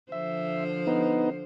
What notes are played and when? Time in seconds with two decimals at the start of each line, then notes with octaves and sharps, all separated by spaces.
0.12 D3 F3 C5 E5
0.87 B3 D#4